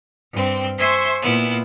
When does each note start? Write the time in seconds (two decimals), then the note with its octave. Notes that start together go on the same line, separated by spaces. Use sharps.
0.31 G2 C4
0.77 C5 E5 G#5 C6 C#6
1.21 A#2 B3 E4